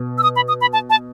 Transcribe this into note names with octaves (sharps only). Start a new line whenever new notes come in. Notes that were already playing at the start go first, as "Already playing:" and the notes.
Already playing: B2
E6
D#6
B5
D#6
B5
A5
A5